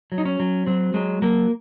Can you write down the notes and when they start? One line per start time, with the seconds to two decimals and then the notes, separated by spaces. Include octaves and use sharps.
0.12 F#3
0.18 D#4
0.25 C#4
0.40 F#3
0.66 F#3 C4
0.94 F#3 G#3
1.22 F#3 A#3